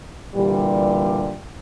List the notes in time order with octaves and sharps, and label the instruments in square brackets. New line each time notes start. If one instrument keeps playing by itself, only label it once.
[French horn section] A#2 D3 E3 G3